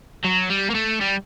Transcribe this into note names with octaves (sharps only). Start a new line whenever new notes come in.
F#3
G3
A#3
A3
G3